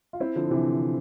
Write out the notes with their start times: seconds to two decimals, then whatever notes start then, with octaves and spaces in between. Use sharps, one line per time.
0.13 F4
0.20 C4 E4
0.36 D3 F3
0.51 C3 E3